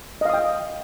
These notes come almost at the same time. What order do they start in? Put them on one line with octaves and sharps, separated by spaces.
D#5 F5 D#6 G5